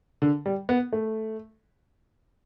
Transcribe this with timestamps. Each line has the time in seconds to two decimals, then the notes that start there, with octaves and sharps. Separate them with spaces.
0.22 D3
0.46 G3
0.69 B3
0.93 A3